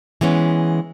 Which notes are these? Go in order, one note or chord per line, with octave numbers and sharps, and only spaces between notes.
E3 G#3 B3 C#4